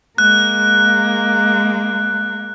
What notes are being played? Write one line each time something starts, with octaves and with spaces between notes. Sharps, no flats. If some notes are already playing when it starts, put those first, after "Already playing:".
G#3 A#3 F#6